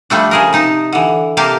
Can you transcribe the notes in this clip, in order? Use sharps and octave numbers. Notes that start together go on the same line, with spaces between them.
F3 G3 A3 D4
C#3 G#4 A#4
C3 D#4 A5
D3 E3
C3 A#3 G4 F5 A5